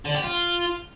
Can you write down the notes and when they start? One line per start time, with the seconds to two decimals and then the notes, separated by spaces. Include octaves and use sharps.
0.05 D3
0.15 G4
0.24 F4